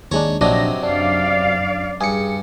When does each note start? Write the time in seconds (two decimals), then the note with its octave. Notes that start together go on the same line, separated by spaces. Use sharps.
0.11 D#2 G#3 D4 C#5 A5 A#5
0.41 A#1 C3 F#3 D4 D#4 A#6
0.83 F#2 D4 D5 F5
2.01 G2 G#4 C#7